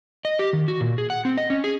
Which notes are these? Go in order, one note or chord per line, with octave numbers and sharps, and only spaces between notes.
D#5
G4
D#3
F#4
A#2
G#4
F#5
C4
D#5
C#4
G#4